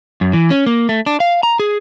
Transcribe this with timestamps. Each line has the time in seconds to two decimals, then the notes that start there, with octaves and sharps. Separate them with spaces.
0.21 F#2
0.33 E3
0.50 C#4
0.66 A#3
0.89 A3
1.06 D4
1.20 F5
1.43 A#5
1.60 G#4